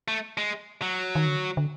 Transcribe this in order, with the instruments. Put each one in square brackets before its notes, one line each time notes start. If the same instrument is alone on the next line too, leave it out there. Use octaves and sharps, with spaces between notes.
[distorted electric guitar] A3
G#3
F#3
[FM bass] D#3
D3
D3